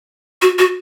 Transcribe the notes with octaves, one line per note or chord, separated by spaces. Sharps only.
F#4
F#4